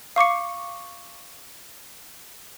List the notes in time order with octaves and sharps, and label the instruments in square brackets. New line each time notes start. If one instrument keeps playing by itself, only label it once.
[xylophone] F5 C#6 D6 C#7